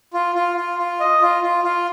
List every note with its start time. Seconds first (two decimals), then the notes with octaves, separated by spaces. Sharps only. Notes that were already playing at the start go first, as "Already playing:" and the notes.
0.14 F4
0.35 F4
0.57 F4
0.79 F4
1.00 D#5
1.22 F4
1.43 F4
1.64 F4